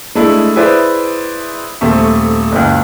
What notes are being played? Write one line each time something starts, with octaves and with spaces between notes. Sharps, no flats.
G#3 A3 D4 E4
E4 G#4 B4 C5 D5 E5
D#1 A3 C4 E5 C#6
F#1 C#2